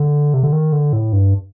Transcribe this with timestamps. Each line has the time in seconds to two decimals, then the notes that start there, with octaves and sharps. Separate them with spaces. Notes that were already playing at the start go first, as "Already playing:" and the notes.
Already playing: D3
0.34 C3
0.43 D3
0.53 D#3
0.72 D3
0.93 A2
1.13 G2